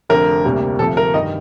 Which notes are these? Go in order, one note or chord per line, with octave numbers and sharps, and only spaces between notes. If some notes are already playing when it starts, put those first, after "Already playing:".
F1 F2 D3 A#4
D2 C3 G3 A#3
D2 C3 F3 A4
A#4
G2 D#3 D#5